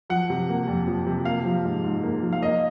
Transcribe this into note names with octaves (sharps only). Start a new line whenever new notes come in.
F3 F#5
C3
A#3
F2
F3
C3
A#3 F5
F3
G#2
G#2
A#3
F3
F5
A#3 D#5